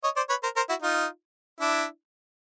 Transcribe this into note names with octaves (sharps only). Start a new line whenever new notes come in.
C#5 D#5
C5 D5
B4 C#5
A#4 C5
A#4 C5
E4 F#4
D#4 F4
D4 E4